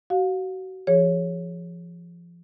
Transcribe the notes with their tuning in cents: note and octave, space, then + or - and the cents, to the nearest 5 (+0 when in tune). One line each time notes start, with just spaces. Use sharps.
F#4 +30 F5 +35
F3 -25 G#4 -5 C#5 +0